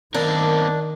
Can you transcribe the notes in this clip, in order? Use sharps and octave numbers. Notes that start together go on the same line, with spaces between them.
D#3 B3 C4 D4 A#4